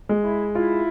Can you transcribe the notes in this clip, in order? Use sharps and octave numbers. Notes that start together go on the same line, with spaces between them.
G#3
E4
E4 F4